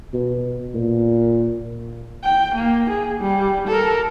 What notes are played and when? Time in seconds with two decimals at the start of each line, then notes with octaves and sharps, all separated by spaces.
0.13 B2
0.75 A#2
2.24 G5
2.55 A#3
2.90 G#4
3.20 G3
3.68 A4 A#4